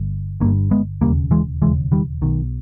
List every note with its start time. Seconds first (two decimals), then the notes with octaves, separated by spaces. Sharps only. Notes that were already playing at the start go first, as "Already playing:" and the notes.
Already playing: G1 G2
0.40 G1 A#3 C#4
0.44 G2
0.71 G#3 B3
1.01 E1 D#2 C#3 G3 A#3
1.31 E3 G#3
1.62 E1 D#2 C#3 E3 G#3
1.92 D#3 G3
2.22 B1 B2 D#3